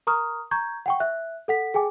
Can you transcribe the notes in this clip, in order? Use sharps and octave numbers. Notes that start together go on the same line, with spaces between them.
A#4 A#5 C#6 D#6 F6
A#5 C#6 G6 G#6
F#5 G5 C#6
E5 F#6
A4 F#5 B6
G#4 G5 G#5 D6